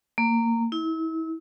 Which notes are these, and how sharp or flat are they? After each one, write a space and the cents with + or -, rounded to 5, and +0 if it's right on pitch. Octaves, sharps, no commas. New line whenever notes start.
A#3 -20
E4 -35